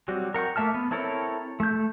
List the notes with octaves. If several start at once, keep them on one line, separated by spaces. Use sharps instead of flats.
F#3 G3 C4 F#4
A#4 F#5 G5 C#6
A3 A#3 E5 A5 F6
B3
C4 E4 A4 A#4 C#5
A3 G6